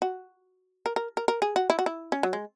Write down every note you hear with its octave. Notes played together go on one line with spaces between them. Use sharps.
F#4
A#4
A#4
A#4
A#4
G#4
F#4
E4
F#4
E4
C#4
F#3
G#3